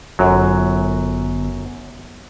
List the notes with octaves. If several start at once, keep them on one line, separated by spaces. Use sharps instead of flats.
G1 F#2 F#3